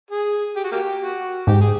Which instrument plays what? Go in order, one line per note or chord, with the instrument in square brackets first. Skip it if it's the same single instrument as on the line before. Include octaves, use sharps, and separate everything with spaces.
[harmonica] G#4
G4
F#4
A#3 G4
F#4
[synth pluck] G#2 [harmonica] G4
[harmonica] G#4